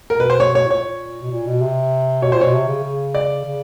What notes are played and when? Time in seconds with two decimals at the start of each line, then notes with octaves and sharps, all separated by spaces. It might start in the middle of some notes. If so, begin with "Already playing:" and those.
0.10 B2 A#4
0.20 B4
0.30 C5
0.40 C#5
0.55 C#5
0.66 A2
0.71 A#2 C#5
1.21 B2
1.31 A#2
1.47 B2
1.61 C3
2.22 B2 C#5
2.32 A#2 C5
2.41 B2 C#5
2.54 C3
2.68 C#3
2.83 C#3
3.15 D5
3.45 C#3